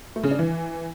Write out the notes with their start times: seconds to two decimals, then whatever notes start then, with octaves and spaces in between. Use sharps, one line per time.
0.16 A3
0.23 C#3
0.31 D4
0.39 E3